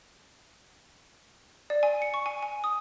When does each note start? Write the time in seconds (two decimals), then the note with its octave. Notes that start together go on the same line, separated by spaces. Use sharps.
1.70 D5
1.83 G#5
2.02 C#7
2.14 C#6
2.26 G#5
2.42 G#5
2.64 D#6